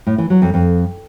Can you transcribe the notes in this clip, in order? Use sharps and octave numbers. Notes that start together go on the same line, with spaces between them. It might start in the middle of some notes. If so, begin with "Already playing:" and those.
A2
E3
F#3
F2
F2